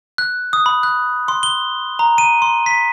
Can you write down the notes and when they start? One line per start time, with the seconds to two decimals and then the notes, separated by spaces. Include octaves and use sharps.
0.18 F#6
0.53 D#6
0.66 B5
0.83 F#6
1.28 C6
1.43 G7
1.99 A#5
2.18 D#7
2.42 C6
2.66 B6